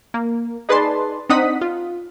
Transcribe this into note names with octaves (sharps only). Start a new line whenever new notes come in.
A#3
D#4 G#4 B4 D5 A5 C6
C4 D4 D#4 F#5 D#6 B6
F4